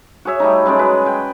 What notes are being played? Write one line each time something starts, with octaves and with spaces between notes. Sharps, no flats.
F#4 G#4 C#5 E5
G3 A3 D#4
F#3 G#3 C#4 D5
B4
G5